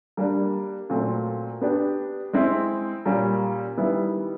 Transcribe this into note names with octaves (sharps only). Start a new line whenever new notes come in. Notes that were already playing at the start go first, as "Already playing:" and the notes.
G3 A#3 D4
A#2 F#3 A3 C4
B3 D4 G4
G#3 C4 E4
A#2 G3 A#3 C#4
D#3 G3 B3 E4